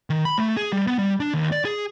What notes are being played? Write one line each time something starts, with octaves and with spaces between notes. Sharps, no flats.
D#3
B5
A3
G#4
G3
B3
G3
D4
D#2
D5
G#4